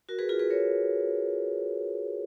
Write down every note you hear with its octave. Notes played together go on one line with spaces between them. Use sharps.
F#4 A#4
G#4 B4
F4 G#4
G#4 B4
A#4 C#5